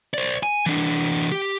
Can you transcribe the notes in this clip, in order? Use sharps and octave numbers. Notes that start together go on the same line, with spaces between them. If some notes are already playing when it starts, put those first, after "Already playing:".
C5 D5
G#5
E3 D4
G4